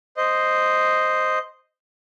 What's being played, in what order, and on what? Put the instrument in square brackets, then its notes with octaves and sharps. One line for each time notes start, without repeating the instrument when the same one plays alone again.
[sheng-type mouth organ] C5 D#5